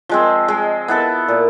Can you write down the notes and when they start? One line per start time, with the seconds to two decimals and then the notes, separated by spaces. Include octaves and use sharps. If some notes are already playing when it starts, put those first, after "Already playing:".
0.09 F3 G#3 C4
0.48 G#3
0.88 B3 E4 A4
1.28 A#2